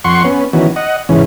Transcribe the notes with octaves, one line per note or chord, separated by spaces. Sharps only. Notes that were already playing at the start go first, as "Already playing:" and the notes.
F2 F#5 C6 C#6
B3 C#4
D#3 E3 B3 C#4 F#4
D#5 F#5
E2 G#2 C#3 E3 C#4